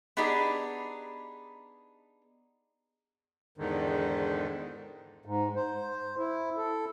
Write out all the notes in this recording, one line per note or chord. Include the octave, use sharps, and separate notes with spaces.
B3 D4 D#4 G4 G#4
E2 G#2 D3 D#3
G#2
C5
E4
A4